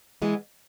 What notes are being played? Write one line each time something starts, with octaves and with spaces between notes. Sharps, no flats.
E3 G#3 B3